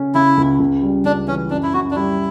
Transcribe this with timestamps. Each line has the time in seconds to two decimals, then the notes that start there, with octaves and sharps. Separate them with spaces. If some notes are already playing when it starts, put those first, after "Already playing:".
Already playing: C#3 C#4
0.15 C#3 E4
0.37 C#2
0.59 C#2
0.82 G3
1.05 C#2 D4
1.28 E3 C#4
1.50 F#2 D4
1.63 E4
1.74 F#2 F#4
1.91 D4
1.96 G3 E4